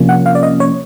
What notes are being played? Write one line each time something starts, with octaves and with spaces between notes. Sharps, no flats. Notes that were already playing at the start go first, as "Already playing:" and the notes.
Already playing: C3 F3 A#3 C#4
F#5
F5
D5
D#5
C#5